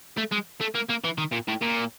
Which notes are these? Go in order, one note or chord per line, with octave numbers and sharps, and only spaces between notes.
A3
G#3
A3
A#3
A#3
E3
D#3
A#2
A2
A#2